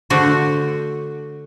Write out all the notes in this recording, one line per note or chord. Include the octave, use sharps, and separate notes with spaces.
D3 A3 F#4 C5